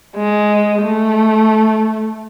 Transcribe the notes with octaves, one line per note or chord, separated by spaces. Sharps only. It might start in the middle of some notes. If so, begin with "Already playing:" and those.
G#3
A3